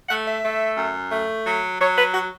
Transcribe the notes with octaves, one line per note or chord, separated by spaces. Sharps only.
A3 F#5
E5
A3
F#2
A3
F#3
F#3 C#5
B4
F#4